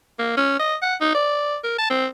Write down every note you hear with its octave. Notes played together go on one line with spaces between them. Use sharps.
A#3
C#4
D#5
F#5
D#4
D5
A#4
A5
C4